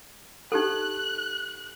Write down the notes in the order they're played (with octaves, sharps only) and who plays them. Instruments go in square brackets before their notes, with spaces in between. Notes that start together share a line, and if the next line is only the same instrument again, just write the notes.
[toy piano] D#4 G4 A4 [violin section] F#6